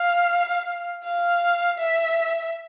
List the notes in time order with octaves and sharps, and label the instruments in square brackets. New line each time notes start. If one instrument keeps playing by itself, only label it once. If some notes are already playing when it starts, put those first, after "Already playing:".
Already playing: [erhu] F5
F5
E5